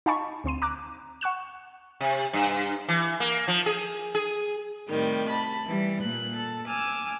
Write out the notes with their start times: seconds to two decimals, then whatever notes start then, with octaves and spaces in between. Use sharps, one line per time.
0.06 D#4 F5 G#5 A5 B5 C#6
0.44 D2 C4 C6 D#7
0.62 A#5 D6 F#6
1.21 F#5 C#6 F#6 E7
2.01 C3
2.33 G2
2.89 E3
3.20 A#3
3.48 F3
3.66 G#4
4.15 G#4
4.89 A2 C3 D#3 G3
5.29 A5 B5
5.66 E3 G3
6.03 A#2 A#3 F#6
6.36 A4
6.68 G#5 D6 E6 F6